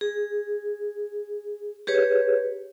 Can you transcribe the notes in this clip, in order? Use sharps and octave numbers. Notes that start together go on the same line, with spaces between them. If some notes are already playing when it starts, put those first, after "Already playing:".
G#4
G4 G#4 B4 C#5